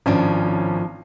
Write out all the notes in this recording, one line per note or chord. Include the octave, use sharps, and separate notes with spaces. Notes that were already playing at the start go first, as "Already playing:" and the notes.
G#1 A2 F3 C#4 D4